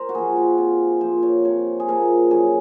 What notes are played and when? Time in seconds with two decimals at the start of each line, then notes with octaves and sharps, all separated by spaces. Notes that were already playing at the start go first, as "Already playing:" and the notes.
Already playing: A#4 C5
0.09 F#4
0.15 F3 A#3 G#4
0.36 F#4
0.58 C3 F4
1.01 F3 A#3 C5
1.23 C#5
1.45 C3 C#5
1.80 G#4
1.88 F3 A#3 A#4
2.31 F#2 G#4